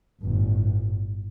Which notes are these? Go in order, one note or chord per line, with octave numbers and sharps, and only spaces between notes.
G1 A2